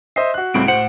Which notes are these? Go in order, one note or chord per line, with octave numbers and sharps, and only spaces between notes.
C5 D#5 E5 C7
F#4 F#6
C#2 A2 G3 C4 E4 D7
A2 C5 F#5